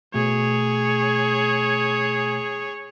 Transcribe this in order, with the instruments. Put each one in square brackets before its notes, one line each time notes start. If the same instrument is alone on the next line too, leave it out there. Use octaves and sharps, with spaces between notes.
[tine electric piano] B2 A3 [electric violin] G#4 C#5